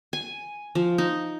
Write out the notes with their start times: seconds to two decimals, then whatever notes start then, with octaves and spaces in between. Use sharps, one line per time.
0.13 G#5
0.75 F3
0.98 D#4